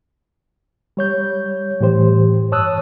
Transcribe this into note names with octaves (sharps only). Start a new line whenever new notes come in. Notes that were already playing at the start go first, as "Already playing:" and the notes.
G3 C#5 G6
A2 E3 G4 C5
G2 C#5 A5 D#6 E6 F#6